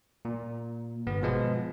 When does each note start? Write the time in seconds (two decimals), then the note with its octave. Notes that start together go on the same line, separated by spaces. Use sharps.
0.25 A#2
1.07 G1 B3
1.22 B2 F3 G#3 B3